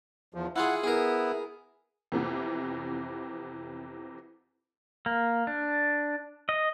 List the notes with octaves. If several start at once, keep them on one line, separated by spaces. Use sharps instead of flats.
E2 F3
E4 F4 G#4 F#5
B3 E4 G#4 A#4
F2 C3 E3 B3
A#3
D4
D#5